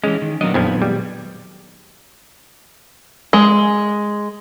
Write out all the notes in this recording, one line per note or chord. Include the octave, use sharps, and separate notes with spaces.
E3 G#3 C#4
D#3
A#2 D#3 F#3 A#3 B3 D4 D#5
A#1 F2 F3 B3 G#6
G3 G#3
G#3